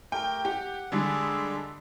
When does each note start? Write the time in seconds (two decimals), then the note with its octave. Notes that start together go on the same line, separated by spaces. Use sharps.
0.12 A3 G4 A#4 G5
0.45 G4 F#5
0.92 D3 G3 G#3 G#4 A4 D5